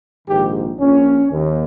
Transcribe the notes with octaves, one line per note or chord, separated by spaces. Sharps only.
A#1 G#2 D#3 G4
A#1 A#2 C#4
D#2 D#3